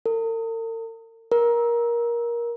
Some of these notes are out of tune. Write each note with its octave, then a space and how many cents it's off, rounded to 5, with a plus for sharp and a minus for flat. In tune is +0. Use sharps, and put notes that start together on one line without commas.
A#4 -45
A#4 +20